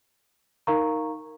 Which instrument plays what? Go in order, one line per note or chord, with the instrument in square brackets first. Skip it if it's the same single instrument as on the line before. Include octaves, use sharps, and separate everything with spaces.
[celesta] D#4 A#4 F5 A#5 C#6